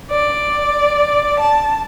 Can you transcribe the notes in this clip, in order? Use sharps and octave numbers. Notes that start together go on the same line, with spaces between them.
D5
A5